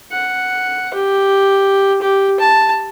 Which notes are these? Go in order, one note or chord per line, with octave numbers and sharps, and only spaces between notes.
F#5
G4
G4
A5